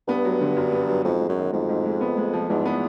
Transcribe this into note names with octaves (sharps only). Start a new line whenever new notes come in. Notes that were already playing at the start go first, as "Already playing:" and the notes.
G2 B3
F#3
D3
F#2
B3
F#3
F2 G#2
G#3
F#2
D#3
F2 G#2
G#2
G#3
B3
G#3
F3
E2 G#2
B3